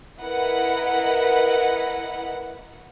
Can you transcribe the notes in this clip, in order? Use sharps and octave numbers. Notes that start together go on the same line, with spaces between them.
E4 A#4 B4 D#5 F#5